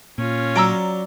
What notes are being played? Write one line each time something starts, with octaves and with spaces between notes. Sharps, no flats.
A#2 C#4 F4
F#3 D5 A#5 E6